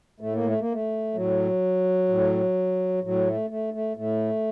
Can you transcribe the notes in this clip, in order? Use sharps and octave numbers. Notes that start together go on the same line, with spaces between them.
A2 A3
A#3
A3
A#3
A3
A2 F#3
A2
A2 F#3
A3
A3
A3
A2 A3